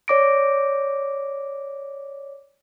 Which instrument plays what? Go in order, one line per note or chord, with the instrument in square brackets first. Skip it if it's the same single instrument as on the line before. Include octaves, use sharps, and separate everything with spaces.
[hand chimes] C#5 D5 D6 A#6 D7